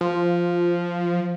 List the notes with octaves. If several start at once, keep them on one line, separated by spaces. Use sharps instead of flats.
F3